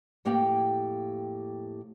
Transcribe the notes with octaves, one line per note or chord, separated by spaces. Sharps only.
F2 A2 A#3 G4 G5